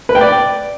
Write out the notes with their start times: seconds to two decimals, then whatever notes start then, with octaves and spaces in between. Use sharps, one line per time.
0.09 B4
0.15 G5
0.21 D5